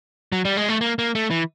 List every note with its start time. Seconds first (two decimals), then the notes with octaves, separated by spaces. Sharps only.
0.32 F#3
0.45 G3
0.57 G#3
0.69 A3
0.81 A#3
0.99 A#3
1.15 A3
1.30 E3